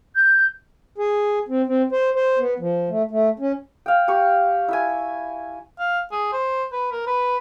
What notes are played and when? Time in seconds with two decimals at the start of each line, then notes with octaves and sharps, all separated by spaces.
0.15 G6
0.98 G#4
1.49 C4
1.67 C4
1.92 C5
2.15 C5
2.39 B3
2.59 F3
2.89 A3
3.11 A3
3.39 C#4
3.86 F5 G5
4.08 G4 C#6
4.68 E4 E5 G#5
5.79 F5
6.12 G#4
6.33 C5
6.72 B4
6.92 A#4
7.07 B4